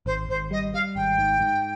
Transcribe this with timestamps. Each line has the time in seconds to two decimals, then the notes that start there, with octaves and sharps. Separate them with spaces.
0.06 G#1 C5
0.29 G#1 C5
0.51 G3 D#5
0.73 G3 F5
0.95 G#1 G5
1.18 G#2
1.40 G#2